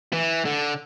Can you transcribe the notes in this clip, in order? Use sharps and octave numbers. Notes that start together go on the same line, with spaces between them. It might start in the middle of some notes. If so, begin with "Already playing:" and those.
E3
D3